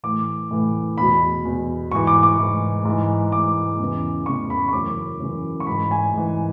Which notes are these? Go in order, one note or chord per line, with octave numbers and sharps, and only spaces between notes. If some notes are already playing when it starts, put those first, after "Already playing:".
A2 E3 D6
A2 E3
E2 B2 B5
E2 B2
G#2 E3 C#6
D6
D6
G#2 E3
G#2 E3
G#2 E3 D6
E2 C#3 E3
E2 C#3 E3 C#6
B5
C#6
F#2 C#3 E3 D6
F#2 C#3 E3
C#6
G#2 E3 B5
G#5
G#2 E3